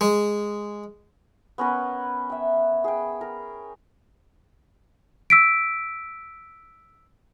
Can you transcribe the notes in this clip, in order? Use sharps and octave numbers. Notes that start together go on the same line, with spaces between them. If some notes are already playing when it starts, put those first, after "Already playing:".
G#3
B3 C#4 A#4 B4
E5 G5
G#4 G5
A#4
E6 B6 D7